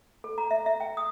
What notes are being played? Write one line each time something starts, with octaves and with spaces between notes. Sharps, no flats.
A4
A#5
E5
E5
G5
D#6